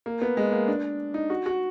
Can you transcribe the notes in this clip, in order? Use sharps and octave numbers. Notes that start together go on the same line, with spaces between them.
A#3
B3
G#3
A#3
D4
D#4
F#4
F#4